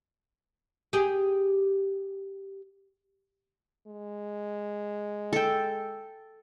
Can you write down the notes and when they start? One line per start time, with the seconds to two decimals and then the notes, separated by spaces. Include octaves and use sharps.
0.93 G4 G#4
3.87 G#3
5.33 A4 G5